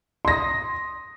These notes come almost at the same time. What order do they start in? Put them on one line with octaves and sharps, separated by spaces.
C6 A#6 D#6